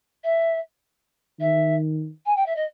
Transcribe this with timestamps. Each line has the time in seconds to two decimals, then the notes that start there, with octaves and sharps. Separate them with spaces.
0.24 E5
1.40 D#3 E5
2.26 G#5
2.36 G5
2.46 E5
2.56 D#5